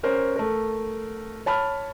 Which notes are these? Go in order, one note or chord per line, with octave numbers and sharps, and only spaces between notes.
C#4 A#4 C5
A3 A#4
C#5 A5 B5 F6